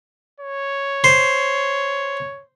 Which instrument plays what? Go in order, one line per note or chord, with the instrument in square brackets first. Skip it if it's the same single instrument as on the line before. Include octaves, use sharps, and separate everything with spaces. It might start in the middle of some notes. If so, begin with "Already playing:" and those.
[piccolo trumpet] C#5
[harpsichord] C5